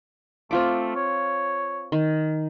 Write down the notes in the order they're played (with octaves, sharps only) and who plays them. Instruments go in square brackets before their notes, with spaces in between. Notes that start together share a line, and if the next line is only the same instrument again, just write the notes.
[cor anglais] A3 [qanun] C4 F4 D6
[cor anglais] C#5
[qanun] D#3